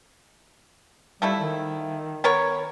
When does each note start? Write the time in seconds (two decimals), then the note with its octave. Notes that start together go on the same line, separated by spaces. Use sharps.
1.22 F3 G3 A3 E4
1.39 D#3
2.24 B3 A#4 C#5